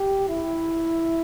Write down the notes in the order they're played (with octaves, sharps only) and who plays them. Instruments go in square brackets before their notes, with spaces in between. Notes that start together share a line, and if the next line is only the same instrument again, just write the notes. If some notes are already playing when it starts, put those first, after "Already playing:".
Already playing: [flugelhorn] G4
E4